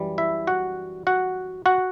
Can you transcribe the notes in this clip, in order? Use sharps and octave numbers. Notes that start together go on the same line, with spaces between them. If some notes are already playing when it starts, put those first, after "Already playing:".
Already playing: F#2 E3 G3
E4 E5
F#4 F#5
F#4 F#5
F#4 F#5